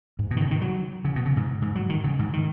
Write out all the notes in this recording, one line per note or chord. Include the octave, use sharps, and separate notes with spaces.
G#2
B2
D#3
C#3
D#3
F#3
C#3
B2
C#3
G#2
G#2
F#3
D#3
C#3
G#2
D#3